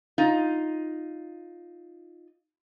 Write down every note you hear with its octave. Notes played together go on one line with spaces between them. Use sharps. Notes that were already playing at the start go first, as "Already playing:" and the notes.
D#4 F4